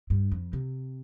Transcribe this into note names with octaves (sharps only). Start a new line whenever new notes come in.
G2
F2
C3